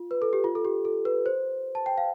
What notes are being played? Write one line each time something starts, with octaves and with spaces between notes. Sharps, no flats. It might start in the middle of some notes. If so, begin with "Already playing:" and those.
Already playing: F4
B4
A4
G4
F4
A4
G4
A4
B4
C5
A5
G5
F5